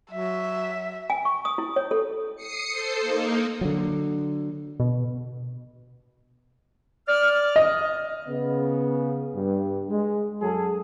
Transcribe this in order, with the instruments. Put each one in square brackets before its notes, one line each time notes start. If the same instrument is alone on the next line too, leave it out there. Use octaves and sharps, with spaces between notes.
[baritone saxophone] F#3 [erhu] E5
[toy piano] G#5
C#6
D#6
E4
C#5
A4
[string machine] D#6 C7 C#7
A4 C5
A#3 D#4
[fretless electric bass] D3 F#3
[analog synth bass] B2
[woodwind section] D5 F6
[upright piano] D#5
[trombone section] C#3 B3
G2
G#3
F#2 F#3 G#4 A4